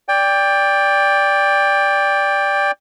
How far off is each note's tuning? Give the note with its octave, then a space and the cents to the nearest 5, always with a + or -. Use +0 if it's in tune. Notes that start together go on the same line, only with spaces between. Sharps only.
D5 -10 G5 +20